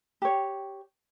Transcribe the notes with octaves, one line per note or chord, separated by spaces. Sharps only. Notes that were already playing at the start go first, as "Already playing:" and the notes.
G4 C#5